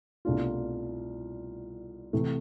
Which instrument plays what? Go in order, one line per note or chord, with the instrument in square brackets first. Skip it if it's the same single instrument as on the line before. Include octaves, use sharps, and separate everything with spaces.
[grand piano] C2 B2 A3 D4 F4
C3 E3 A3